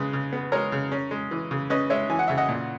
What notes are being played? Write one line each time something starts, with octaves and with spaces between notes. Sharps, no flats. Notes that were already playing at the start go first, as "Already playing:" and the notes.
Already playing: C#3 G#3 G#4 B4
C#3
B3
G#3 A#4 C#5
C#3
C#4
G#3
E3
C#3
C#4 B4 D#5
G#3 C#5 E5
E3 G#5
F#5
C#3 E5
D#5 F#5
A#2